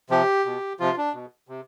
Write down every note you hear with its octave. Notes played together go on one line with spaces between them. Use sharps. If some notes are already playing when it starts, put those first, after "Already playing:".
C3 F3 G4
B2
C3 F3 F4
D4
B2
C3